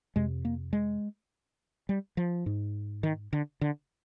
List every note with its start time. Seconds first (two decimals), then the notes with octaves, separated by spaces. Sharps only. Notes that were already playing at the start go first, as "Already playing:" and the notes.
0.16 F2 C3 G#3
0.45 A#3
0.73 G#3
1.89 G3
2.17 F3
2.46 G#2
3.03 D#3
3.33 D3
3.61 D3